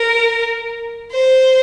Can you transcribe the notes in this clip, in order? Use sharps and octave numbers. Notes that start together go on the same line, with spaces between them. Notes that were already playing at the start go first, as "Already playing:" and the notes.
Already playing: A#4
C5